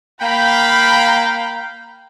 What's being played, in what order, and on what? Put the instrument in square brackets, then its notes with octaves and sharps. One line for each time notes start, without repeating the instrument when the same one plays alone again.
[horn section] A#3 F5 G5 [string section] B5